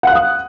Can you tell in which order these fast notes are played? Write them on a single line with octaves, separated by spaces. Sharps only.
F#5 F#6 F5 D#6